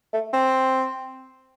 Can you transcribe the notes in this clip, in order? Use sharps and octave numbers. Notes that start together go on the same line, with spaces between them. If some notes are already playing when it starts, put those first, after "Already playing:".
A3
C4